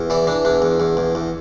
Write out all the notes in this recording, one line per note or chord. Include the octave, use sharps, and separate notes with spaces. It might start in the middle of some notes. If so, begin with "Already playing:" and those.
Already playing: E2
E3 D5
E3 D4
E2 D4
E2
E2
E2
E2